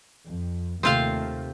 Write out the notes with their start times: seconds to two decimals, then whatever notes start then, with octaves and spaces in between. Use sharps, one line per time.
0.24 F2
0.83 D#2 C3 A3 C4 F4 F5